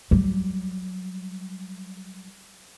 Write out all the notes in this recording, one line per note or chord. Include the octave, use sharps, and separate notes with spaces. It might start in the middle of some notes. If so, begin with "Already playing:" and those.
F#3 G3